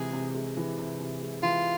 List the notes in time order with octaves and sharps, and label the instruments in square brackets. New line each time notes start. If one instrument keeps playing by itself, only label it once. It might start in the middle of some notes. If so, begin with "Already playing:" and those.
Already playing: [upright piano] C3 E3 G#3 [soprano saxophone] G#4
[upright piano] C3
G#3
E3
C3
C3
G#3
[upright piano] E3 [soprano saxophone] F4